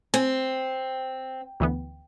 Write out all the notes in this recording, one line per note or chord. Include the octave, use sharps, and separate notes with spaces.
C4 G#5
D2 E3 B3